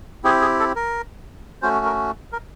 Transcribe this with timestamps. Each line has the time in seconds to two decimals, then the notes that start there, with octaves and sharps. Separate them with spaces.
0.24 C4 E4 G4 G#4
0.41 G#4
0.60 A4
0.76 A#4
1.62 A3 C#4 F#4 C5
1.85 A#4
2.32 A#4